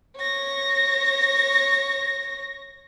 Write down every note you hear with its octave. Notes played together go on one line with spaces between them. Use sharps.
C#5 A#6